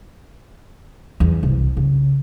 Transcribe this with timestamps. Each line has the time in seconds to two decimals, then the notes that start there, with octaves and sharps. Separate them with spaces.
1.20 E2
1.43 C2
1.77 C#3